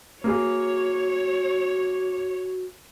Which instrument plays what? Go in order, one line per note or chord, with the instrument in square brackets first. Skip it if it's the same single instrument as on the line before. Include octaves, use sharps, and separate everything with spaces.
[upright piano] A#3 G#4 [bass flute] F#4 [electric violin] C#5